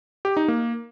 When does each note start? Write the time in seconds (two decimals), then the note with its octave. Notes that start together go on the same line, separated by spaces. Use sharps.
0.25 G4
0.37 D#4
0.48 A#3